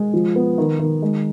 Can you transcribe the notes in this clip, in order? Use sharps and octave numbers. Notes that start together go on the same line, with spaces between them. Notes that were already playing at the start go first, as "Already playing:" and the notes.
Already playing: G#3
F3
B3
D#3
D#3
G#3